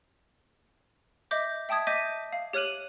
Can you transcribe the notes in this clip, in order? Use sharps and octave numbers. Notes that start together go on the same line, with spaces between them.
D#5 E5 D6 G6
E5 G5 A5 D#6 G#6
D#5 E5 D6 G6 B6 D#7
F5
G4 C#5 F6 F#6 D#7 F#7